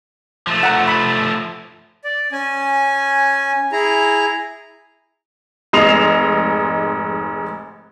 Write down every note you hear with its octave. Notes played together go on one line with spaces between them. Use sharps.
F3 A3
F#5 A#5
B5
D5
C#4 G#5
E4 G#4 A#5
F1 G#2 D#5 C7 E7 F7